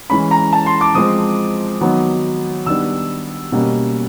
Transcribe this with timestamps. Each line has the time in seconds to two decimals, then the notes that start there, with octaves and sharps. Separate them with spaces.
0.10 E3 G#3 C#4 B5
0.31 A#5
0.53 A5
0.66 C6
0.81 D6
0.95 F3 G#3 C4 D#6
1.81 D#3 F#3 B3
2.66 D#3 G3 B3 D4 E6
3.52 B2 G3 A#3 C#4